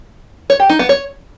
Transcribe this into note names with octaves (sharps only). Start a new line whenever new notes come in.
C#5
G4
D#4
B3
C#5